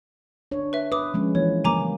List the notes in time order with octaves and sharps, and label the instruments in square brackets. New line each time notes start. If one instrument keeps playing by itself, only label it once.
[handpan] D4 C#5
[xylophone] B4 E5
[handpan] B4 [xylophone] D6 D#6
[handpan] F3 G#3 C#4
[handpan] E3 A#3 E4 [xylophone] C#5
[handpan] C#3 G3 A#3 [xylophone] G#5 A#5 D6